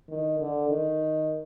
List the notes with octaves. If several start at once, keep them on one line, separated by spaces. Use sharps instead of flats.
D#3
D3
D#3